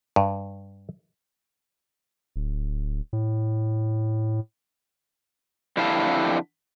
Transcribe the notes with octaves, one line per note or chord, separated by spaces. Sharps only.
G2
D1
A2
F2 D3 E4 G4 F5 A5